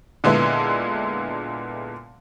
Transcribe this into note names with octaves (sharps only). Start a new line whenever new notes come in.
A#2 D3 G#3 B3 E4